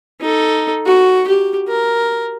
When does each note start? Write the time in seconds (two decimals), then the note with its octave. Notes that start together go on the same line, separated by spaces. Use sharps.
0.20 D#4 A4
0.85 F#4
1.27 G4
1.68 A#4